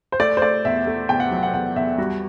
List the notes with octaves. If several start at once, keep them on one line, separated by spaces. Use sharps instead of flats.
C5
A3 D5
C5
A3 D5
E2 E5
A3
E2 G5
F#5
F#3
F#5
E2 F#5
E2 E5
G3 F#4